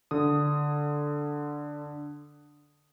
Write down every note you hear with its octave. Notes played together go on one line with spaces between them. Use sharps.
D3 D#6